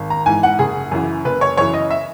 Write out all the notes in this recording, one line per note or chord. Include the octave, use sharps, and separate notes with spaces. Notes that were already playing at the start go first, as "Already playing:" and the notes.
Already playing: G#1
A#5
G#2 E3 G#5
F#5
F#1 G#4
F#2 C#3 E3
F#1 B4
C#5
F#2 C#3 E3 C#5
D#5
E5